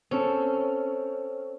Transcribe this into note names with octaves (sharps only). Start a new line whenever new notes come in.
C4 C#4 A4